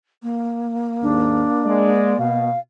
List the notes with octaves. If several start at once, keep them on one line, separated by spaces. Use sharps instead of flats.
A#3
D#2 G#2 D4
G#3 D5
B2 F5